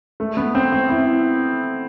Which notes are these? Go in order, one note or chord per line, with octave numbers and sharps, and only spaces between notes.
A3
B3
C4
C4
E4